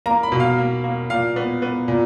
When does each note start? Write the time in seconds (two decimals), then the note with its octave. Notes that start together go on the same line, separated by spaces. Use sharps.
0.06 A#3 A#5
0.23 B5
0.32 B2
0.40 F5
0.58 A#3
0.84 A#3
1.10 A#2 F5
1.36 B3
1.62 B3
1.88 A#2